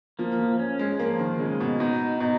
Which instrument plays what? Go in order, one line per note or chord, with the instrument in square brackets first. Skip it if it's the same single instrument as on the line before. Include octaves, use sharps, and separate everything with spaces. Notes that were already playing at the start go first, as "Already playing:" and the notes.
[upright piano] F3 [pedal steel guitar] A#3
[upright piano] F3
[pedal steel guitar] C#4
[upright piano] G#3
[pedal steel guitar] F3 [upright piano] A#3
[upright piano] D#3
[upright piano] C#3 [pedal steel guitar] G#3
[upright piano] B2
[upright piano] B2 [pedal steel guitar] D#4
[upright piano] B2 [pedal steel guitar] D#4